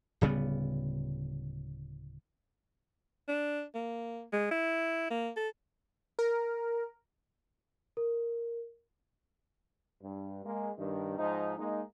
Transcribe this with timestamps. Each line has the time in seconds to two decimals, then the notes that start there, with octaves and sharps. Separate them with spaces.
0.21 D1 C#3 G3 B3
3.28 D4
3.75 A#3
4.33 G#3
4.51 E4
5.11 A#3
5.36 A4
6.19 A#4
7.97 A#4
10.01 G2
10.44 G#3 A#3
10.78 G2 D#3
11.18 G#2 F3 D#4
11.58 G#3 A#3 D#4